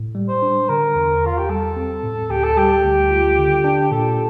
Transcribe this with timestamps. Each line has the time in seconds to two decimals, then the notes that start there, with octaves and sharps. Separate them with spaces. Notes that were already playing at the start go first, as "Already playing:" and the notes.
Already playing: A2
0.15 G3
0.29 C5
0.42 D4
0.69 D3 A#4
0.95 E2
1.23 E2 F4
1.38 G4
1.49 G3 A4
1.76 C4
2.03 A2
2.30 D2 G4
2.43 A4
2.57 G3 G4
2.84 D2
3.10 F4
3.38 D3
3.64 D4
3.91 A#2 A4